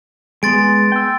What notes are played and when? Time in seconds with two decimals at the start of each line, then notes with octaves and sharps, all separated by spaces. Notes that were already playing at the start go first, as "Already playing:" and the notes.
0.43 G#3 B3 C6 A6 D7
0.92 G5 E6